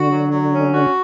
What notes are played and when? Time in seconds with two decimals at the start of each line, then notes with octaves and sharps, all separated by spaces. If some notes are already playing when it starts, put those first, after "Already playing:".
Already playing: D3 F#4
0.09 F#3
0.30 F#3
0.52 C#4
0.74 F#4